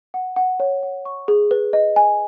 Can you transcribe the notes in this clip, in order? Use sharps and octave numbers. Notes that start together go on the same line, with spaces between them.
F#5
F#5
C#5
F#5
C#6
G#4
B4
D#5
G#5